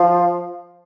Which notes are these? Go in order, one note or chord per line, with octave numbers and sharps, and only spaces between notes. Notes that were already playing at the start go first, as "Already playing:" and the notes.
Already playing: F3